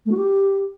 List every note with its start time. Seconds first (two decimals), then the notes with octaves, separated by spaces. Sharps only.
0.06 A3
0.11 F#4
0.17 G4